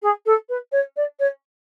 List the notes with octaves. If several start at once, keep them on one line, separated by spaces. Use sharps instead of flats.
G#4
A4
B4
C#5
D5
C#5